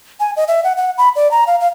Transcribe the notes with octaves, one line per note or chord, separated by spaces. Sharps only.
G#5
D#5
E5
F#5
F#5
B5
D5
A#5
F5
F5